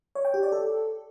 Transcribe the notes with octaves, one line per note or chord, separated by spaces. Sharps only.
C#5
G5
G4
D5
A4